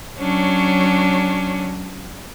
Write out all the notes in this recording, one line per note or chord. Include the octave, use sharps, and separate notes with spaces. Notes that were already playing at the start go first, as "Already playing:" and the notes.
F#3 C#4 D4